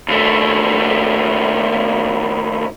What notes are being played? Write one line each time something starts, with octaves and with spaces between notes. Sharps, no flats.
D#2 A3